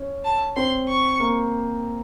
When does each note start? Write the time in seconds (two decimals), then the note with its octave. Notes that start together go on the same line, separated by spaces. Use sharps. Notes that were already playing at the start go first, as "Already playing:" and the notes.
Already playing: C#4
0.24 A5
0.56 C4 C6
0.88 C#6
1.20 A#3